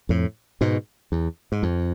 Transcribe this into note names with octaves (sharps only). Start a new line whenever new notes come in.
F2 A2
G#2 B2
E2
G#2
F2